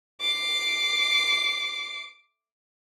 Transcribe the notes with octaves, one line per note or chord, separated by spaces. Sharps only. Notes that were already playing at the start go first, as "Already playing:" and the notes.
D6 C7